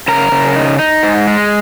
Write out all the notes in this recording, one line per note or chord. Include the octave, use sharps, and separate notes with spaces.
C#3 A#4 A#5
C#3
D#4
D#4
G#2
G#3